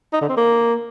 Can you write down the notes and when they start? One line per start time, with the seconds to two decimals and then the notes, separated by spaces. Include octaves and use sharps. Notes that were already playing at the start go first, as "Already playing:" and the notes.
0.13 D#4
0.21 D3
0.29 C4
0.37 A#3